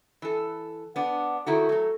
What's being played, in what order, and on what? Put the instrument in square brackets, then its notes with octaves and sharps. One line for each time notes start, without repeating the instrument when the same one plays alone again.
[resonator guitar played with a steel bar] E3 A4
[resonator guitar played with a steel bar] B3 D4 [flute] F#5
[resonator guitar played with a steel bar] D#3 E4 F#4 [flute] A4
[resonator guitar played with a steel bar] F#3 A3